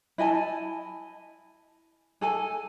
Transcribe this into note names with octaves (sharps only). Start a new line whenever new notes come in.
E4 D#5 G#5 A5
G#4 A4 G#5